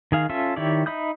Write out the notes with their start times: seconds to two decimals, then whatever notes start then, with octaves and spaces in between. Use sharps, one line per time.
0.12 D#3 G#4 F5
0.29 C#4 F4 A4 E5
0.56 D#3 E4 G4 C#5 D5
0.86 D#4 E5 B5 D#6 G6